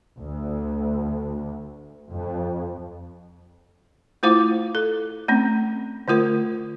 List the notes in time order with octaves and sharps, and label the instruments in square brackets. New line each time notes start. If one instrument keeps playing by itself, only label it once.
[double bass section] D2
F2
[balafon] A3 E4 F4 C5 F5 D6
A4
A3 C4 C#4
D3 A3 F4 A#4